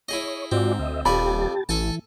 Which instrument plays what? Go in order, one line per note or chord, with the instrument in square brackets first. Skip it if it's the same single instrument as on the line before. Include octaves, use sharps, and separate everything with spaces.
[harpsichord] E4 G#4 D#5 [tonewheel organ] C#5
[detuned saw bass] G#2 [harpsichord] C4 [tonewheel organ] F4 F#4 D5
[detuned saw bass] D2 [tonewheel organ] D#5 E5
[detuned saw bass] D#1 [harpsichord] F2 D5 G#5 [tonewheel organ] G4 A5 [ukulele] B5
[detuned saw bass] A1 [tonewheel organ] E3 [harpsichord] A4 G#5 A5